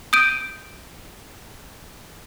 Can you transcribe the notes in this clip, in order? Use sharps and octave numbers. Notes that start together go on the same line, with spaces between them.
D#6 G6 D7 D#7